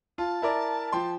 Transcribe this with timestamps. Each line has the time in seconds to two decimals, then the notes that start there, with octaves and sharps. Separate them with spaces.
0.18 F4 A5
0.42 E4 A#4 D5
0.92 F3 G5 C6